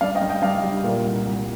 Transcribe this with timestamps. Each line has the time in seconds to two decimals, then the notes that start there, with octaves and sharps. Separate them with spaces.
0.01 G2 D5 F5
0.15 D#5 G5
0.22 G2
0.30 D#5 G5
0.42 G2 D5 F5
0.63 G3
0.84 A#2 A#4
1.05 C2
1.25 C2